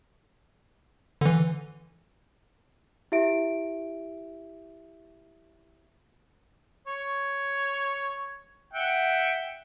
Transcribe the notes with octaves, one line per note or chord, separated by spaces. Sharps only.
D3 E3
E4 G4 E5 D7
C#5
E5 F#5 G5